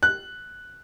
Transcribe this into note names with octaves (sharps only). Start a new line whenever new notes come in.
F#6